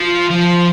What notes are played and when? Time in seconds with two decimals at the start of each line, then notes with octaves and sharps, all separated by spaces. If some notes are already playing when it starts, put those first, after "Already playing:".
Already playing: F3
0.30 F3